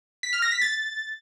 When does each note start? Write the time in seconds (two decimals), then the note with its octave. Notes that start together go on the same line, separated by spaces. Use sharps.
0.23 B6
0.33 F6
0.42 A#6
0.52 B6
0.62 A6